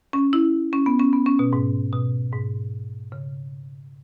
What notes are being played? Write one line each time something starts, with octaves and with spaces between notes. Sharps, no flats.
C#4
E4
C#4
B3
C#4
B3
C#4
B2
G#2
B2
G#2
C#3